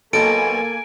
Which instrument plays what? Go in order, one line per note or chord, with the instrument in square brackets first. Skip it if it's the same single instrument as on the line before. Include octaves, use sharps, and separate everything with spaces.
[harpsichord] B1 B2 [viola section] A#3 G#5 [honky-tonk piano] A4 [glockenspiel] D7